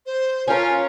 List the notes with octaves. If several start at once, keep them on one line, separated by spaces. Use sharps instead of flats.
C5
C#4 F4 A#4